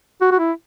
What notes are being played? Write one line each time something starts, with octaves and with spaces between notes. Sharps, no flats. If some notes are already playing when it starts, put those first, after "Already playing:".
F#4
F#4
E4